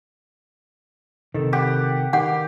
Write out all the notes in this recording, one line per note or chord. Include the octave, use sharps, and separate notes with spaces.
C3 D#3 A4
G4 F#5
D#3 G4 F#5